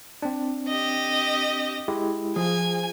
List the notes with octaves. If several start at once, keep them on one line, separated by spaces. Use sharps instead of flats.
C4 D4
G4 D#5
G#3 E4 G4
F3 G#4 G#5